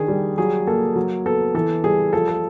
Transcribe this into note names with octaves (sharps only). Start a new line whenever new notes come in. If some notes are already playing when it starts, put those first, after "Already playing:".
Already playing: D#3 D4 G#4
G3
F#3 G#4
A#3 A4
F#3
B3 A4
E3 A4
G3 G#4
F3 A4
A4